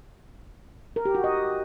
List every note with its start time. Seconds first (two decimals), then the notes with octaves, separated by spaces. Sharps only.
0.96 A#4
1.05 G4
1.15 F#4
1.24 D#5